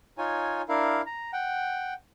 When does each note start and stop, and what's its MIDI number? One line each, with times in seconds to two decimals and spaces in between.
0.18 0.62 63
0.18 0.62 65
0.18 0.62 73
0.18 0.62 80
0.69 1.01 62
0.69 1.01 64
0.69 1.01 70
0.69 1.01 77
1.06 1.31 82
1.33 1.94 78
1.33 1.94 79